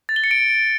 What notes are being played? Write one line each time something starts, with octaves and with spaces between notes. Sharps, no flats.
A6
G7
C#7
D7